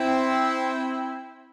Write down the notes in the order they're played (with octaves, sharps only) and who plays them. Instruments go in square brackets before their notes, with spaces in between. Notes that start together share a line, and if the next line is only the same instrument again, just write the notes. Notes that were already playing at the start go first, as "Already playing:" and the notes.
Already playing: [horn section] C4 E4